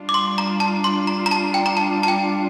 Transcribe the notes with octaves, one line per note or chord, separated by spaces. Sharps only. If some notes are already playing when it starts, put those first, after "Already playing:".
Already playing: G3 D4 F4
D6
C6
A#5
A5
C6
A#5
A#5
A5
G5
A#5
A5
A5
G5